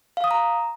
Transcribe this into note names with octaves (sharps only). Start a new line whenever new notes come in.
F5
D#6
A#5